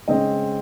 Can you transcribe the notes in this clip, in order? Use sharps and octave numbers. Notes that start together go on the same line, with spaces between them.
C#3 G#3 C4 D#5